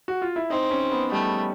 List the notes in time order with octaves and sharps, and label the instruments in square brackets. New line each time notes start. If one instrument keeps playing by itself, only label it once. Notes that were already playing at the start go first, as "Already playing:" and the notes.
[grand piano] F#4
F4
E4
[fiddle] C4 [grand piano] D#4
[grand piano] C#4
B3
[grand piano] G3 [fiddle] A3